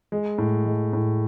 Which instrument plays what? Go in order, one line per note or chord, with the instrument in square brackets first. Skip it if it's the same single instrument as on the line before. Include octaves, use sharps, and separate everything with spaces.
[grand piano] G#3
A2
G#3
A2